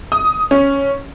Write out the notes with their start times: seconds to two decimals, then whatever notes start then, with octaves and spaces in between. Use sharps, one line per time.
0.12 D#6
0.51 C#4